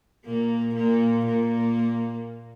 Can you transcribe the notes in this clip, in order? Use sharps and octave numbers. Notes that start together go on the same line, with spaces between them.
A#2 A#3
A#2 A#3
A#2 A#3